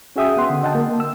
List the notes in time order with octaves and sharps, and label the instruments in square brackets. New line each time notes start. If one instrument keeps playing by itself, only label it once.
[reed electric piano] C#4 F#4 G#4 E5 G5 D#6
B3 F#5 C6
D3
D#5 F#5 G5 A5
A#3
E6